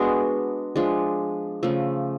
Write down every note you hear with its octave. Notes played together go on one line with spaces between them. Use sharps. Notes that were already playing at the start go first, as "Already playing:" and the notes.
Already playing: G#3 B3 D4 F#4
F3 G#3 D4
C#3 F3 A3